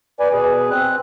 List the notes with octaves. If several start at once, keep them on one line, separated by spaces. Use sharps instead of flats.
B4 D5 G#5
B2 G#4 B4
C4 F#6